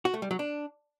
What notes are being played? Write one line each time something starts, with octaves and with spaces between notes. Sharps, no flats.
F#4
A3
G3
F#3
D4